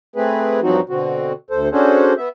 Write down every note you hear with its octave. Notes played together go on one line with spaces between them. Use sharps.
A3 C4 G#4 B4
G2 F3 F#3 C4 D#4 F#4
B2 D3 C4 F#4
D2 A4 C5
C#4 D4 F#4 G#4 A4 C5
B3 E5